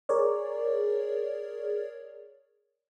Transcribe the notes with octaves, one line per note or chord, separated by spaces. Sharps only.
G#4 A#4 C#5 D5